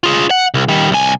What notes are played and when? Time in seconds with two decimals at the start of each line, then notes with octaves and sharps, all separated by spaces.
0.04 F4 G#4
0.31 F#5
0.54 C2
0.68 D#3 G3
0.91 C2 G#5